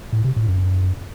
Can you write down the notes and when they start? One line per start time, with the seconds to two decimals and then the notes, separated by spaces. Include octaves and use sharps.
0.12 A2
0.24 C3
0.36 A2
0.48 F#2